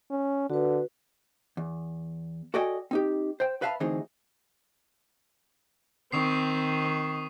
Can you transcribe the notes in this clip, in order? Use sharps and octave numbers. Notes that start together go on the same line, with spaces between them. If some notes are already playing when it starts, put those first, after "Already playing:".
C#4
D3 F#4 B4
E2
F#4 A4 D5 D#5 G5 G#5
C4 D#4 G4
C5 G5
B4 E5 F5 A5 B5
D2 E3 C4 D#4 G#4
D#3 C4 C#6 D#6 C7